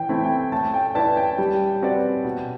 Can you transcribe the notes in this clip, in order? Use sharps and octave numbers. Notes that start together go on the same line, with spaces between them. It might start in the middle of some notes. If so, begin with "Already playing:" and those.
Already playing: E3 G5
A3 C4 E4
G5
A3 A5
G5
E4 B4 D5 A5
G5
G3
C4 F#4 B4 D5
B2